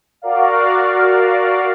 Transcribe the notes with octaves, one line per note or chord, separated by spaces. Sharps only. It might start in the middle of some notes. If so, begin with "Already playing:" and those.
F#4 A#4 D5 F5